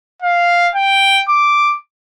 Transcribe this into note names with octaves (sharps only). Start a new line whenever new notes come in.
F5
G5
D6